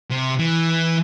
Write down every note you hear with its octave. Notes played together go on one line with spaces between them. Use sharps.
C3
E3